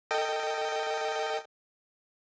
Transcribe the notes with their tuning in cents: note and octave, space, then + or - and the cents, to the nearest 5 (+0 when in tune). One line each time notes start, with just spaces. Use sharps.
A4 +30 D#5 +0 G5 +0